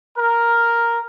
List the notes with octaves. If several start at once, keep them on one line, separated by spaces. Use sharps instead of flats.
A#4